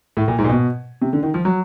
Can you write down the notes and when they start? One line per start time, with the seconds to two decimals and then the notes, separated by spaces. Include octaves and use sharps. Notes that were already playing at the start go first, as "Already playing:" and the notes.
0.17 A2
0.28 A#2
0.39 G#2
0.44 A#2
0.49 B2
1.02 C3
1.13 D3
1.23 D#3
1.34 F3
1.45 F#3